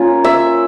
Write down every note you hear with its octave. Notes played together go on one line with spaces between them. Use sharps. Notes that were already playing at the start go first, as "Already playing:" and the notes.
Already playing: A#3 C#4 F4
E5